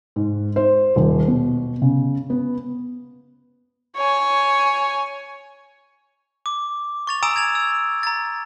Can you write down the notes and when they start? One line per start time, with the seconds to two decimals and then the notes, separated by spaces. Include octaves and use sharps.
0.16 G#2
0.56 C5
0.96 D#1
1.28 B2
1.82 C#3
2.30 B3
3.97 C#5 G#5
6.46 D6
7.07 C#6 A6 F7
7.23 G#5 A#5 D#6 E6 D7 E7
7.36 G#6 A6 F7
7.55 E6
8.03 A#5 A6